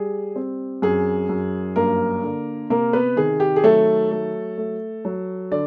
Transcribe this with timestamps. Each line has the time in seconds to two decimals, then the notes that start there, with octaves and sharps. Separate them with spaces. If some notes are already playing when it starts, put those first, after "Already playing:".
Already playing: G3 G#4
0.36 C4
0.82 F#2 G#4
1.29 F#2
1.76 G2 A#3 A#4
2.23 D3
2.70 C3 A#3 A#4
2.93 B3 B4
3.16 D#3 G#4
3.40 G4
3.56 G#4
3.64 F#3 A3 A4
4.11 A3
4.58 A3
5.05 F#3
5.52 D3 D5